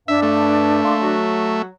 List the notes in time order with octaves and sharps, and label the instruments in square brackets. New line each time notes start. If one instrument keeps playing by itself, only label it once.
[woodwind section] G2 [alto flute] D4 [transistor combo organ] E5
[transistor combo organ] A3
[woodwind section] A#3 C6
F#3 F#4